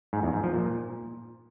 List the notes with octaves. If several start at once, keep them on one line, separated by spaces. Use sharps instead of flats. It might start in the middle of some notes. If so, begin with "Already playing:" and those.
G#2
E2
G#2
F3
A#2